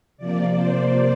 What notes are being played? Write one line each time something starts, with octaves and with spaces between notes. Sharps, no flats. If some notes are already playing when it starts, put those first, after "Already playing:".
C3 F3 A#3 D5
C5